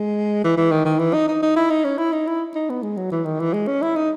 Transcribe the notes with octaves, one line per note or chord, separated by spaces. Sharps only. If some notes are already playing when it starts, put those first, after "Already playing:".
Already playing: G#3
E3
E3
D#3
D#3
E3
D#4
D#4
D#4
E4
D#4
C#4
E4
D#4
E4
D#4
B3
G#3
F#3
E3
D#3
E3
G#3
C#4
E4
D#4